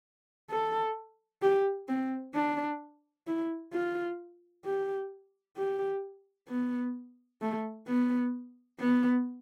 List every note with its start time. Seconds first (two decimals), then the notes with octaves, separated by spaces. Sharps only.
0.50 A4
1.42 G4
1.88 C4
2.35 D4
3.27 E4
3.73 F4
4.65 G4
5.57 G4
6.49 B3
7.42 A3
7.88 B3
8.80 B3